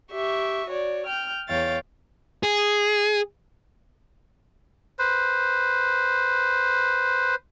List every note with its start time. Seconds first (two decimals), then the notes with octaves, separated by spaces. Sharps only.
0.13 G4 E5 C#6
0.69 F#4 C#5 D5
1.07 G5 F6 G6
1.48 E2 C#5 F5 G5 A6
2.43 G#4
4.99 B4 C5